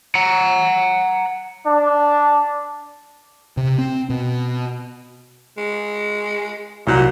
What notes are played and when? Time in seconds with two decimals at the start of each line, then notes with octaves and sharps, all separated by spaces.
0.15 F#5 A#5
1.65 D4
3.57 C3
3.78 C4
4.10 B2
5.57 G#3
6.87 C2 A#2 F#3 F#6